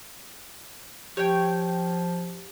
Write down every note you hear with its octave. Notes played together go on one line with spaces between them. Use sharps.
F3 G4 C#5 G5